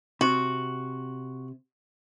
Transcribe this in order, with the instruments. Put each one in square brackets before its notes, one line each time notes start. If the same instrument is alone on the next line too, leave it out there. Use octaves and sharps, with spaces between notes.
[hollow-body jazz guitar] C3 [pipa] F#4